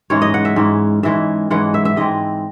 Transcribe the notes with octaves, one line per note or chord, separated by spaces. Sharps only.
G#2 E3 G#3 C#4 C#5
D#5
F#5
E5
G#2 E3 G#3 C#4
G#2 E3 G#3 C#4 E5
G#2 E3 G#3 C#4 F#5
E5
E5
G#2 E3 G#3 C4 D#5